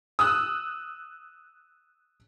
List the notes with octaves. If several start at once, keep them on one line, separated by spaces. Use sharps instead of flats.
D#6 E6 F#6